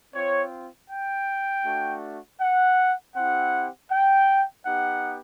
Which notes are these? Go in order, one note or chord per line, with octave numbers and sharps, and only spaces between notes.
C4 F4 C#5
G5
A3 D4 F#4
F#5
C4 E4 G4 F#5
G5
B3 D#4 G4 F#5